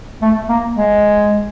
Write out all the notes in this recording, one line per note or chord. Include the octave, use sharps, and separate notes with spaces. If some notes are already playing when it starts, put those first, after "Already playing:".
A3
A#3
G#3